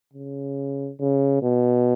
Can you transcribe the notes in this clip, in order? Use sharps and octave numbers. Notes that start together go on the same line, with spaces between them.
C#3
C#3
B2